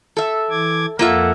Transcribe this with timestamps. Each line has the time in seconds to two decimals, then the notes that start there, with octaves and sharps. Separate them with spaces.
0.17 A4 E5
0.50 E3 D6 G#6
0.99 F2 A#3 F4 A4 E5 F#5